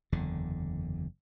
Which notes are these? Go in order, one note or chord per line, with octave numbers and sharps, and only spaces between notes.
F#1 E2 D3